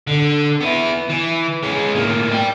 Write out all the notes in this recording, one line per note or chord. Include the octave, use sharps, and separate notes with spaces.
D3
B3 E4
E3
G#3 C#4
A2 A#3
D5 G5